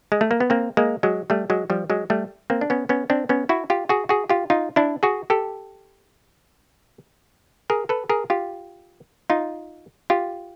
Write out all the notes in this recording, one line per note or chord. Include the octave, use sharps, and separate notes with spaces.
G#3
A3
A#3
B3
A#3 C4
G#3 A#3
F#3 G#3
G3 A3
F#3 G#3
F3 G3
F#3 G#3
G3 A3
A#3 C4
D4
B3 C#4
B3 C#4
C4 D4
B3 C#4
E4 F#4
F4 G4
F#4 G#4
F#4 G#4
F4 G4
D#4 F4
D4 E4
F#4 G#4
G4 A4
G#4 A#4
A4 B4
G#4 A#4
F4 G4
D#4 F4
F4 G4